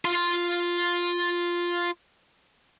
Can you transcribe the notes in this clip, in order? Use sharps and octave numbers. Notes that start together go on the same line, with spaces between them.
F4 C6